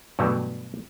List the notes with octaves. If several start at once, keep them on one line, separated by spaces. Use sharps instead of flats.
G2 B2 E3 F#3 G3 A3